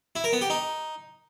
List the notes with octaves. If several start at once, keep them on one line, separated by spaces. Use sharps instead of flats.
E4
A#4
B3
G4
D#4